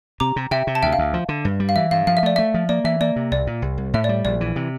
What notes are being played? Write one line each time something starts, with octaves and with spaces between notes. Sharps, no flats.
C3 A#5 D6
C3
C3 E5 G5
C3
A5
D2 E5 G5
F5
D2
F3
D3
G2
G3
F5
E3 E5
G2 F5
F3 F5
E5
A3 D5
A3 E5
F3
A#3 D5
E3 E5
A#3 D5
C3
C2 D5
A#2
C2
C2
A2 E5
G3 D5
A#1 D5
E3
C3